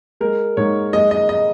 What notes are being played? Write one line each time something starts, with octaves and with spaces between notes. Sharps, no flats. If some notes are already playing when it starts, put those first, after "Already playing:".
G#3 A#4
G#2 C#5
G#3 D#5
D#5
D#5